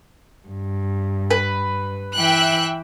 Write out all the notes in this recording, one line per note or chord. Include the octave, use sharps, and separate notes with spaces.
G2
B4
E3 E5 G5 F#6